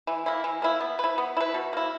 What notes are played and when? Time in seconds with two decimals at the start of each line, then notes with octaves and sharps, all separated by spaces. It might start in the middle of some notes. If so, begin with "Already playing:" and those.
0.07 E3
0.26 A#3 E4
0.44 E3
0.62 A#3 E4
0.81 B3
0.99 E4 B4
1.18 B3
1.37 E4 B4
1.54 B2
1.73 A#3 E4